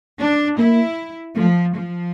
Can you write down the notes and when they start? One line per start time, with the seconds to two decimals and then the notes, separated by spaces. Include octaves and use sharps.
0.19 D4
0.58 A#3 E4
1.36 F3 A3
1.74 F3